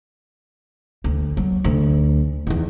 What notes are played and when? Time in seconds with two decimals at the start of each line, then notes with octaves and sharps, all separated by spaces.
1.04 D2
1.37 F#3
1.64 D2
2.47 E2 D#3